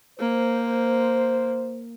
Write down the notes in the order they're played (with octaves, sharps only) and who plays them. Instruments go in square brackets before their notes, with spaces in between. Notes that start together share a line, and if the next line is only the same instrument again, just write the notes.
[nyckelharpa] A#3 [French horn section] C5